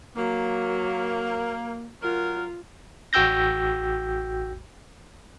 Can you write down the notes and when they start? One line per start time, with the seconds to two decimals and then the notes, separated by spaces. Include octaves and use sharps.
0.17 F#3 A#3
2.02 F#3 F4 A#4
3.13 A1 F#4 G5 E6 G6 A#6